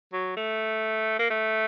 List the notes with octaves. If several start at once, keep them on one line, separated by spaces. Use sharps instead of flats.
F#3
A3
A#3
A3